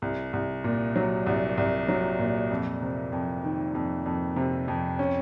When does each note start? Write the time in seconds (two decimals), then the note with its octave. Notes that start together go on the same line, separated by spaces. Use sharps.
0.02 C2
0.33 C2
0.64 A#2
0.96 F#3
1.26 C2
1.57 C2
1.88 F#3
2.19 A#2
2.51 F2
2.82 C3
3.12 F2
3.44 D#3
3.75 F2
4.06 F2
4.36 C3
4.68 F2
4.99 C#4